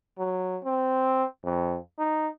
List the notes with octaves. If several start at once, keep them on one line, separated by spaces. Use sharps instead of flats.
F#3
C4
F2
D#4